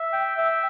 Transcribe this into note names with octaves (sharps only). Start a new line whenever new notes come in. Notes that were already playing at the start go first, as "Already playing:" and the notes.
Already playing: E5
G5
E5